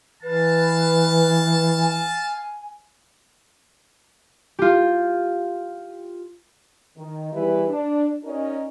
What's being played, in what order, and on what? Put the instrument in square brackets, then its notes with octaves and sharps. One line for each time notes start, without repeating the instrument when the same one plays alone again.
[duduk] E3 [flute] B4 [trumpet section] F5 A5
[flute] G#5
[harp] F4 G4
[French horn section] D#3
E2 E3 G3 E4 G4 B4
D4
C#4 D#4 F#4 A#4 D5 D#5